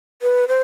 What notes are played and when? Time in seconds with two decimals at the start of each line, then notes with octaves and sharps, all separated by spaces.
0.22 B4
0.48 C5